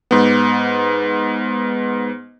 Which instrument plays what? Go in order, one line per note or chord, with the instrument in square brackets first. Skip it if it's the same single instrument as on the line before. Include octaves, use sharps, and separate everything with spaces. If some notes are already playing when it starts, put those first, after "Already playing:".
[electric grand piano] G#2 B3